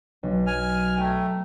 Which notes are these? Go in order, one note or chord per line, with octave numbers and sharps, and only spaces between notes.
B1
G#5 F6
A3 G5 A#5